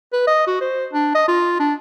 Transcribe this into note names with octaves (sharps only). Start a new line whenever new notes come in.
B4
D#5
F#4
C5
D4
D#5
F4
D4